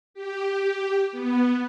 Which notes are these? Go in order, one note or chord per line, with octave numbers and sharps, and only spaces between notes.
G4
B3